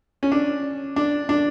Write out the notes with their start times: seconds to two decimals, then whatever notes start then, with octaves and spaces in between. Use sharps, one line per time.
0.23 C#4
0.32 D4
0.96 D4
1.29 D4